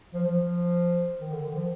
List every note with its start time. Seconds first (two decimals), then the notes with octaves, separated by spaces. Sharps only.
0.14 F3
0.26 F3
1.20 D#3
1.33 D3
1.44 D#3
1.55 F3